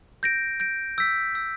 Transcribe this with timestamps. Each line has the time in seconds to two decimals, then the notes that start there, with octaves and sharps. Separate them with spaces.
0.23 G6 A#6 D7
0.60 G6 A#6 D7
0.98 E6 G6 B6
1.35 E6 G6 B6